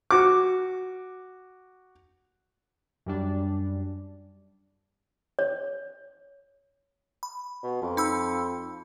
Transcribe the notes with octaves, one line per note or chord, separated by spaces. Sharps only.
F#4 D6
F#2 G3 D4
C#5
B5
B2
F2
D#4 B5 E6